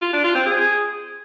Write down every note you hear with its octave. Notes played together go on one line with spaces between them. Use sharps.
F4
D4
F4
C4
G#4